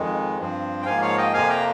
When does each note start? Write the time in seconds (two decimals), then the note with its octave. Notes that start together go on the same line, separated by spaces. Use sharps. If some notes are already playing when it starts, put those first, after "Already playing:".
Already playing: F2 D#3 G#3
0.38 G2 F3 C4
0.82 G5
0.85 G#2 F3 A#3 F5 G#5
1.02 C#5 F5
1.17 D#5 G5
1.33 F2 C3 F3 A#3 F5 G#5
1.50 G5 A#5